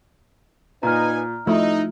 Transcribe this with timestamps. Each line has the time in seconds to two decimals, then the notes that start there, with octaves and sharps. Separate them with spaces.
0.83 A#2 D#4 B4 G#5 A#5 F6
1.47 F3 A3 D#4 E4